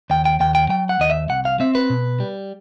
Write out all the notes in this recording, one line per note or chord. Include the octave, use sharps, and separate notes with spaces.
D#2 G5
G5
D#2 G5
G5
F#3 G5
F#5
D#2 D#5
E5
C2 F#5
F5
C4 E5
B4
B2
G3